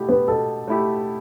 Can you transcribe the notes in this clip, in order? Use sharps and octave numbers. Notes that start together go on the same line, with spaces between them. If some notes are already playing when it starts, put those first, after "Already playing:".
Already playing: B2 A3 E4 G4
B3
B2 A4
A3 E4 G4